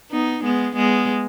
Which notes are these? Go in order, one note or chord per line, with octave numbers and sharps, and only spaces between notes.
B3 D#4
G#3 B3
G#3 B3